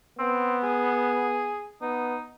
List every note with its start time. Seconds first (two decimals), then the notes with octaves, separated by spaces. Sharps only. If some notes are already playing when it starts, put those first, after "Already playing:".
0.19 B3 C4
0.63 G#4
1.82 B3 D#4